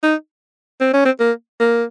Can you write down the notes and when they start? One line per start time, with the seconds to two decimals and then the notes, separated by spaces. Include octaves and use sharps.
0.03 D#4
0.81 C4
0.93 C#4
1.06 C4
1.20 A#3
1.60 A#3